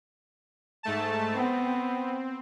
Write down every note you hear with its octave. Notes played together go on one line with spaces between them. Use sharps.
G#2 A3 A5
B3 C4